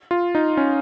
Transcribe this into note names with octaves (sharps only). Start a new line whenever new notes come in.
F4
D#4
C#4